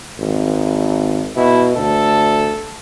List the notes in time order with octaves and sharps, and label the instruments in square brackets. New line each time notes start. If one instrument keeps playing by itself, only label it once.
[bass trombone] G#1
[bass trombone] B2 [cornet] E4
[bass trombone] D2 [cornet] A4